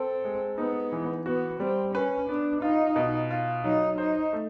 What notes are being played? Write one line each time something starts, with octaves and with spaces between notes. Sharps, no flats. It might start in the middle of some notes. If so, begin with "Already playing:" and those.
Already playing: C4 A4
G#3
B3 D#4
E3
B3 F#4
G3 C4
C#4 B4
B3 D4
D#4 F4
B2
F4
F#3 D#4
D#4 C5
A3